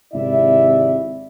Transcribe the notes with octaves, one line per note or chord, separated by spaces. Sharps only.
G#1 C3 E4 D5 E5